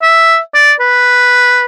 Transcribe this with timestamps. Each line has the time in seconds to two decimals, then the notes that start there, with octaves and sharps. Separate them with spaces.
0.02 E5
0.55 D5
0.80 B4